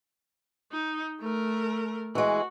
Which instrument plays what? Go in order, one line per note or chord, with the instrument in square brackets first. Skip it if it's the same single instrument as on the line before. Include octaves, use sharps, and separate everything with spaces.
[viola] D#4
A3 A#4
[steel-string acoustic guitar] E3 G#3 [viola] F#4